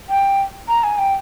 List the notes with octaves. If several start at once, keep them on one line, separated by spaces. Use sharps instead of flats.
G5
A#5
G#5
G5